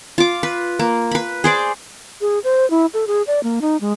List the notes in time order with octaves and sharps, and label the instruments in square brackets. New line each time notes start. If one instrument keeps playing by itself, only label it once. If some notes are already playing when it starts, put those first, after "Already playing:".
[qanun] F4 D6
B4
A#3
B4 B5
G#4 C5 D5
[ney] G#4
C5
E4
A4
G#4
D5
A#3
D#4
G#3